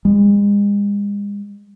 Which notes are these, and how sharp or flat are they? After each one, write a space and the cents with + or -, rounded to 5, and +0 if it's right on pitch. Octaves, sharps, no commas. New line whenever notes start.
G#3 -40